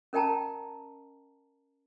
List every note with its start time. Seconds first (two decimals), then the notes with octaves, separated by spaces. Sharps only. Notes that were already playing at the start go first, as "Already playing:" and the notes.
0.13 C#4 A#4 D#5 G5 A5 A#5